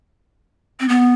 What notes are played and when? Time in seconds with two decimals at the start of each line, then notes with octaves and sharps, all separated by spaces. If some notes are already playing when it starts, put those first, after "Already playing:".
0.80 C4
0.89 B3